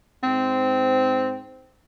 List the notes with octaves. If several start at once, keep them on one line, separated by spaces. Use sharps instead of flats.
G#2 C4